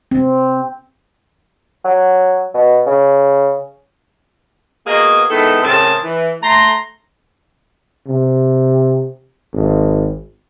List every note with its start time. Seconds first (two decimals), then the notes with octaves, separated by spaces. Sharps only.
0.11 C4
1.84 F#3
2.54 B2
2.86 C#3
4.87 A#3 B3 F#4 G#4 C#5 D#5
5.30 D#3 G#3 B3 E4 A4
5.62 A2 C#3 C4 G#4 A#4 A5
6.03 E3
6.42 A3 A#5 C6
8.07 C3
9.53 G#1